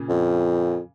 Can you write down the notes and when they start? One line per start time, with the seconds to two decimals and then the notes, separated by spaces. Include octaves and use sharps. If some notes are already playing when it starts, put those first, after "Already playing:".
Already playing: A#2 C#3
0.09 F2